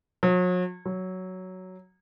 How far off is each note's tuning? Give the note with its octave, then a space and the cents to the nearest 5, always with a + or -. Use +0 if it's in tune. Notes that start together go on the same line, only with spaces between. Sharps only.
F#3 -40
F#3 +5